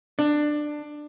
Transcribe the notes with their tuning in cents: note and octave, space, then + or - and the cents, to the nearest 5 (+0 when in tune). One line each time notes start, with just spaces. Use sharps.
D4 +15